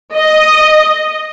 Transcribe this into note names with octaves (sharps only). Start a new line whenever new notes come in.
D#5